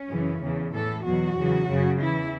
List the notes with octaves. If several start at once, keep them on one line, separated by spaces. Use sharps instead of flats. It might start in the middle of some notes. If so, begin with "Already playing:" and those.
Already playing: C#4
F#2 C#3 E3
E2 C#3 E3
A2 E3 A4
E2 B2 F#3 F#4
E2 C#3 F#3
F#2 C#3 F#3
E2 E3 E4